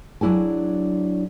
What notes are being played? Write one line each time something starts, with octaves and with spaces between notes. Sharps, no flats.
F#3 D4 E4 G#4 G#5